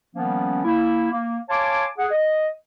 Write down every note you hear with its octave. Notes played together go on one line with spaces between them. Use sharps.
D#3 F3 G3 A#3 B3 C#4
A#3 E4
A#3
C#5 F5 G#5 A5 C6 D6
G#4 F#5
D#5